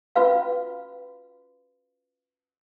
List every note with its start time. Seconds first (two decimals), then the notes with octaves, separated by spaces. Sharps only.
0.16 C#4 F4 F#4 B4 F5